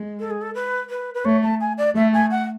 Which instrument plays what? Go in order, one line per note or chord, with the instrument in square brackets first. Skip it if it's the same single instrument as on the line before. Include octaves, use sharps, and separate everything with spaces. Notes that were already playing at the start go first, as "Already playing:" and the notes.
Already playing: [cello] G#3
[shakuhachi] A4
G#4
A4
B4
B4
B4
[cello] A3 [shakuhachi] C#5
[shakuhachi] A5
G#5
D5
[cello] A3 [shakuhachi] E5
[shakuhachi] G#5
F#5